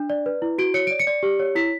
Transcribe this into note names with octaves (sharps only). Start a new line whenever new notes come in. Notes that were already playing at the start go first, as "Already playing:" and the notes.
Already playing: D4
D5
B4
E4
F#4 D7
C#5 C#7
D5 D7
C#7
D5
G4
C#5
E4 B6